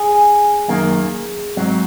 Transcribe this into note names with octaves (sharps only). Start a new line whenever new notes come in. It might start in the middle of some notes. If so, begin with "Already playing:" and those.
Already playing: G#4
F#2 D#3 A#3
G#2 F#3 C4